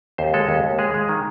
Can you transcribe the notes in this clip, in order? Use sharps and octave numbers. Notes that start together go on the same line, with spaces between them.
D#2 C5
G#3 A4
D#2
D#2
G#3 G#4
G#3
D#3